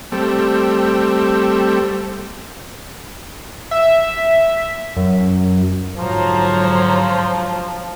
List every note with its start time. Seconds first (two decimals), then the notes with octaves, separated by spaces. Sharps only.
0.12 G3 A3 C4
3.71 E5
4.96 F#2
5.97 G#2 D3 F3 F#3 C5 C#5 A#5